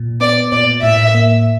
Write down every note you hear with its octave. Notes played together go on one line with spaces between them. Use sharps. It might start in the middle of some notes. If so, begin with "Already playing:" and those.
Already playing: A#2
B3 D5
A#2 D5
A2 E5
A#3